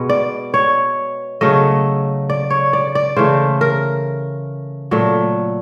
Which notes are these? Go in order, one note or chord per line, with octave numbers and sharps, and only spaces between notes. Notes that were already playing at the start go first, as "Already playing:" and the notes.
Already playing: B2 G#3 B3
D5
C#5
C#3 F#3 A3 D#5
D5
C#5
D5
D5
C#3 E3 A3 C5
A#4
A#2 F#3 A3